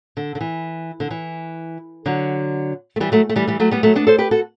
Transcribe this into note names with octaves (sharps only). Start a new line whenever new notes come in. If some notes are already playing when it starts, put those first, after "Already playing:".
D3
D3
E3
D3
E3
D3 F#3
A3
E3 G3
F#3 A3
A3
E3 G3
E3 G3
F#3 A3
G3 B3
F#3 A3
B3 D4
A4 C5
G4 B4
F#4 A4